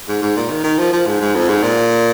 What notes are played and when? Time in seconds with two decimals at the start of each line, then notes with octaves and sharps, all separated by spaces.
0.08 G#2
0.22 G#2
0.36 A#2
0.50 D#3
0.64 D#3
0.78 F3
0.92 F3
1.07 G#2
1.21 G#2
1.35 F2
1.49 G#2
1.63 A#2